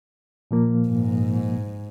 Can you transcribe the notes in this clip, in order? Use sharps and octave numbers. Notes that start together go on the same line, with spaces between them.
A#2 F3 A#3
G#2